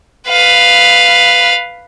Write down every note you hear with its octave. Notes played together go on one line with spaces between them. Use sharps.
B4 F5